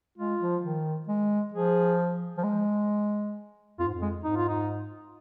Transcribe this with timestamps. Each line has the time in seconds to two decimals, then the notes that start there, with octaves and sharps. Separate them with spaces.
0.18 G#3 F4
0.40 F3
0.63 D#3
1.08 G#3
1.54 F3 G#4
2.37 F3
2.43 G#3
3.79 F2 F4
3.86 G#2
3.94 F2
4.02 G#3
4.24 G#2 D#4
4.36 F4
4.48 D#4